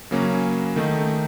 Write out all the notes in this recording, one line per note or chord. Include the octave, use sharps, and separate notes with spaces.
C#3 F#3 A#3 C#4
D#3 A3 D#4